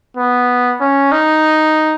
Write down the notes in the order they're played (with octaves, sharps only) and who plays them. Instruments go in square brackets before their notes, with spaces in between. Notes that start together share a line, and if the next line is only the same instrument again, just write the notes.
[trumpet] B3
C#4
D#4